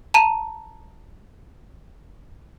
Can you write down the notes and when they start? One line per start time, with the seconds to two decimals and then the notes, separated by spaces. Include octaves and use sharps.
0.14 A5 A#5 D#7